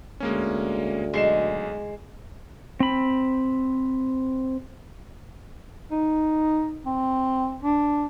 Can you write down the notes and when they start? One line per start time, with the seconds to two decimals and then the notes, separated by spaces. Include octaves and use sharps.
0.20 D2 G#3 A#3 C#4
1.13 B1 G#3 C7 E7
2.80 C4 B5
5.91 D#4
6.85 C4
7.63 D4